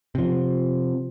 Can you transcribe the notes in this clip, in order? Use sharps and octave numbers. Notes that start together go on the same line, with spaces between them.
C3 F3